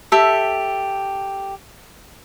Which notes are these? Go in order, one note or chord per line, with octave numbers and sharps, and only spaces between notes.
G4 A4 E5